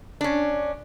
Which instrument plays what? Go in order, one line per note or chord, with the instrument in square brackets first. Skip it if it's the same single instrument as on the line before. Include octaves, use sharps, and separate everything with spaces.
[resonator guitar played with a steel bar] C#4 D4